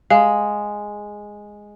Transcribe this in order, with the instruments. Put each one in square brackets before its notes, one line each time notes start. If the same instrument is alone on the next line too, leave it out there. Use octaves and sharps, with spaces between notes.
[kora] G#3 [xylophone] F5